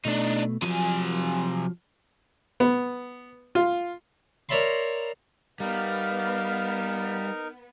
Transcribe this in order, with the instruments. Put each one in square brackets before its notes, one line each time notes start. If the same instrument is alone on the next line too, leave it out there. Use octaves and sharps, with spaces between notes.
[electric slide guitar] B2 A3 [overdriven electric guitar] D4 D#4
[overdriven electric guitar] C3 G#5 [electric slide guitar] F3 F#3
[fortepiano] B3
F4
[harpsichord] A#4 C#5 D5 E5 B5 C6
[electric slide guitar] G3 [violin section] B3 [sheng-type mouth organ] D#4 A#4 [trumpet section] F5